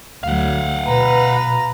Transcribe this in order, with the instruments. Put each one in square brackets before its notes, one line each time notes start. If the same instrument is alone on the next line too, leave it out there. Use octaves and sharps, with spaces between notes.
[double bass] D2 F#3 [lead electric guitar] F5 F#5
[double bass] B2 [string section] B4 [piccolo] A#5